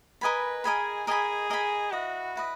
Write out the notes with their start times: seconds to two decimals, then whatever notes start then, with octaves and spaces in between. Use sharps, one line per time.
0.21 A#4 B4 D#5 G#5 B5
0.64 G#4 A#4 D#5 G#5 B5
1.07 G#4 A#4 D#5 G#5 B5
1.50 A#4 D#5 G#5 B5
1.92 E4 F#4 B4 D#5
2.36 E4 B4 D#5